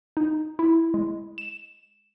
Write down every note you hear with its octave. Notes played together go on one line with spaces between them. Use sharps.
D#4
E4
G#3
E7